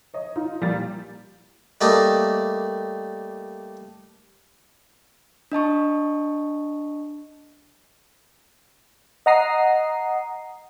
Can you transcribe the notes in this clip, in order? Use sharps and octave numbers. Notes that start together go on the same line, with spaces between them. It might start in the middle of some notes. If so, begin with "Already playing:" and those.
C#5 D#5
D#4 F4
A#2 G3 A#3 G4 A6
G3 A3 A#3 D4 D#4
D4 D#5 A5 C#6
D#5 F#5 A#5 D#6 C7